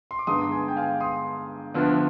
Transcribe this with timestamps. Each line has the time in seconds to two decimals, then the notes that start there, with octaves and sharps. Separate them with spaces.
0.11 C6
0.19 D6
0.27 G2 D3 G#3 B3 D#4 C6 D#6
0.51 G#5 C6
0.68 G5
0.76 F5 G#5
1.00 C6 D#6
1.74 D2 D3 F3 B3